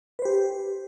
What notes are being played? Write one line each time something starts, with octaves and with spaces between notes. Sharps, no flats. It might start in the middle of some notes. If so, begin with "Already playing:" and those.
G4 B4 C5